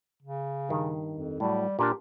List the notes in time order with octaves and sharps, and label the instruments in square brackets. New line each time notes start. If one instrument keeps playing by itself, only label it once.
[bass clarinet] C#3
[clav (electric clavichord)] G2 D#3
[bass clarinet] F2
[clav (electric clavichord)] A2 F#3 [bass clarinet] G3
[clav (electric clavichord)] A#2 D4 A#4 [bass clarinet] G4